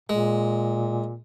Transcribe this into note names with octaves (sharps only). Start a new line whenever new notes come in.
A#2 G#3